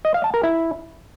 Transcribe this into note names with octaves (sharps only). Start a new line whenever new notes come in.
D#5
F5
A5
A#4
E4